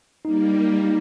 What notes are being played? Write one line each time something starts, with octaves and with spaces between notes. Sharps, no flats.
G3 A#3 D#4
D#4
D#4